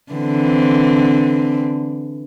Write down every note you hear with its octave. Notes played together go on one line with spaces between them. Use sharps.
D3 E3 C4